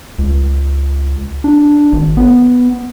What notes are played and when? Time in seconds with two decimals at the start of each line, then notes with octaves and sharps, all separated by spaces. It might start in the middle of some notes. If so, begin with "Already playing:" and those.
0.18 C#2
1.44 D4
1.92 G#1
2.17 B3